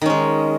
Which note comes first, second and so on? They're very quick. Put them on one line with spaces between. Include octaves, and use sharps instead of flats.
D#3 C#4 G#3